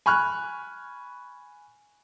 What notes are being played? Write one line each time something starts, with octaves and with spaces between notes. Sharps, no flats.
G#5 B5 C#6 F6 F#6